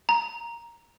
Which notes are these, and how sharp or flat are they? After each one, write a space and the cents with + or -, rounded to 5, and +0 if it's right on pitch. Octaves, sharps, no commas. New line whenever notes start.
A#5 +10